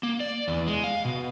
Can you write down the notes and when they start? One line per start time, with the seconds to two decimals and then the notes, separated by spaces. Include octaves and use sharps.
0.03 A#3
0.20 D5
0.48 E2
0.67 G#3
0.84 F5
1.05 B2